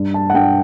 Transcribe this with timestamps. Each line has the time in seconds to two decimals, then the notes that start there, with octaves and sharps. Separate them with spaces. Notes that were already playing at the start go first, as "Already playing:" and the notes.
Already playing: G2
0.14 A5
0.30 F#5
0.34 G2 G5